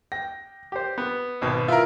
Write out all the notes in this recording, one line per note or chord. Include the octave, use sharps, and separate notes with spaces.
G5 A#6
G4 C5
B3
G#1 B2
E4 F4 A#4